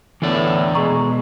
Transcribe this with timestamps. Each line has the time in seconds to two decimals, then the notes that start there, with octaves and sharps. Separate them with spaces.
0.22 E2 A2 D3 E3 B3 D5
0.75 B2 G#3 A#5 C#6